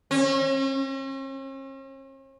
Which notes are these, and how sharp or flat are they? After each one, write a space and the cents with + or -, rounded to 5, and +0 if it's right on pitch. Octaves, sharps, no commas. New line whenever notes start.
C#4 -45